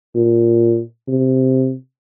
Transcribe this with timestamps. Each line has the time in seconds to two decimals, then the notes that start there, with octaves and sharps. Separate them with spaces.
0.16 A#2
1.08 C3